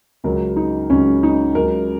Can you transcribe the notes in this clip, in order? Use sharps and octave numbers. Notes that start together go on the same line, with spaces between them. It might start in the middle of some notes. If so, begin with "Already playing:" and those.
C#2 C#3 F#3 A#4
D#4
C#2 C#3 F#3 C#4
D#4
C#2 C#3 F#3 A#4